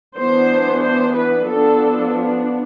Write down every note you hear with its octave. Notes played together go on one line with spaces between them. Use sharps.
E3 B3 D4 C5
C5
B4
F3 B3 D4 A4